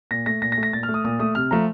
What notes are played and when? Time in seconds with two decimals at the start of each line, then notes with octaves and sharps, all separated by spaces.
0.11 A#2 A#6
0.26 A3 A#6
0.42 A#2 A#6
0.52 A#6
0.57 A3
0.63 A#6
0.73 A#2 A6
0.83 F6
0.89 A3
0.94 D#6
1.04 A#2 D#6
1.19 A3 D#6
1.35 C3 F6
1.51 F3 A3 A#5